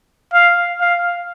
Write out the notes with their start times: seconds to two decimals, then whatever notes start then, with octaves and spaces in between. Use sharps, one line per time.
0.33 F5
0.81 F5